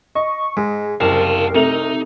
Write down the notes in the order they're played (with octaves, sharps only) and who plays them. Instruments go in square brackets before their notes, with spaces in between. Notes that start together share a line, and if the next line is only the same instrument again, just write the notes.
[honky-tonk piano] D#5 [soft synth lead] C#6
[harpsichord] G#2 [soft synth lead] G#3 [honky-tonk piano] G#4
[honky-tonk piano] F#1 [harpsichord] C2 [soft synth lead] A#4 [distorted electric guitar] F5 A5
[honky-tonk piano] C3 A3 F7 [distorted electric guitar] D#4